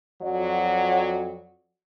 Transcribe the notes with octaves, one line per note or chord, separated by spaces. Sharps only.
F2 F#3 F#4 D5